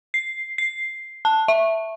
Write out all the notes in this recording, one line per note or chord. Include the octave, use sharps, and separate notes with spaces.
C7
C7
A5
E5